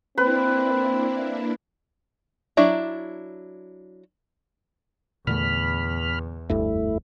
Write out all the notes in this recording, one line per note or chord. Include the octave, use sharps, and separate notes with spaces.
A#3 C4 D4 E4 B4
F#3 D4 E4 A#5
E2 A#2 D3 A3 B5 F6
F1 D2 G2 A3 E4